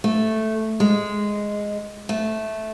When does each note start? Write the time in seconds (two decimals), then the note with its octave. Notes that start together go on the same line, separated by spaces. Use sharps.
0.04 A3
0.80 G#3
2.09 A3